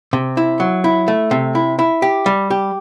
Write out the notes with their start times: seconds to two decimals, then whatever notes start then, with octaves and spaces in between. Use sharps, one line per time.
0.13 C3
0.37 E4
0.60 F#3
0.84 E4
1.08 A3
1.31 C3
1.55 E4
1.79 E4
2.02 G4
2.26 G3
2.50 G4